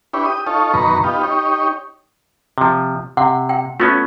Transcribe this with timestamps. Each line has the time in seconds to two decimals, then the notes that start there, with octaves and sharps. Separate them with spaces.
0.14 D4 E4 G4 B4 C#5
0.26 G4 D#6
0.47 D#4 F4 A4 C#5
0.74 F#2 B2 D#3 B4 A#5 C#6
1.04 B3 D#4 F4 G4
1.23 D#4 G4 C#5
2.58 C3 F3
3.17 C3 F#5
3.49 G5
3.80 A3 B3 C#4 F4